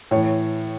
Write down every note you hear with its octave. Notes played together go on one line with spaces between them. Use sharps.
A2 E3 C#5